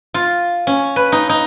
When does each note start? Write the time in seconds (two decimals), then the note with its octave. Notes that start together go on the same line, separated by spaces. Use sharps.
0.14 F4
0.67 C#4
0.96 B4
1.12 D#4
1.29 D#4